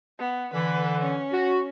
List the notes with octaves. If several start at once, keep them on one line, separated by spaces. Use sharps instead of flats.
B3
D3 E3 B4
C#4
F#4